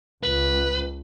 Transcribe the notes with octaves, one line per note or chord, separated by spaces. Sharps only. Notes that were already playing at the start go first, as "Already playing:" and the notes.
C#2 B4